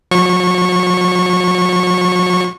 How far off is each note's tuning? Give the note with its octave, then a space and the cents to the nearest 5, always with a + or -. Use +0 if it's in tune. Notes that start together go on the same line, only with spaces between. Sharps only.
F#3 -45 C#6 -15